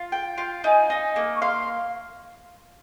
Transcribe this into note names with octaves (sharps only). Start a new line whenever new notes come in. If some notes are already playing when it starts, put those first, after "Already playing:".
Already playing: F4
G5
F4
D#4 G#5
D#4
A#3
C#6
F5 C6